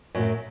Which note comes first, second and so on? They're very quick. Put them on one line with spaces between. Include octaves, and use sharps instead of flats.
F#2 A2 F#3